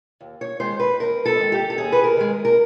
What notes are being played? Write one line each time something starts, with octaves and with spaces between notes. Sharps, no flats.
D#2
C#5
D#3 G#3 C5
B4
D#2 A#4
A4
D#3 G#3
G4
A4
D#2 G#4
B4
A#4
D#3 G#3
A#4